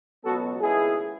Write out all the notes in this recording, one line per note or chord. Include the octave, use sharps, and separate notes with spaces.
C#2 B2 F#3 B3 F#4 A4
D#2 C#3 G#3 B3 E4 G#4